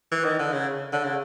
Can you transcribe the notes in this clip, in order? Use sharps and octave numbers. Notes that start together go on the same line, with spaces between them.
E3
D#3
D3
C#3
D3
C#3